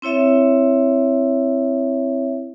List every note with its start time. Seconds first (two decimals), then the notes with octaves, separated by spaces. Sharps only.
0.02 C4 E4 C#5 E5